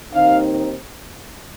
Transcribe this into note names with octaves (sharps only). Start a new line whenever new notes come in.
D#2 D#3 C4 D#4 F5